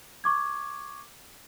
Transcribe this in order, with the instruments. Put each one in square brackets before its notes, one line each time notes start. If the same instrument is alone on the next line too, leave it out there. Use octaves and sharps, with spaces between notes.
[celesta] C#6 D6 G#6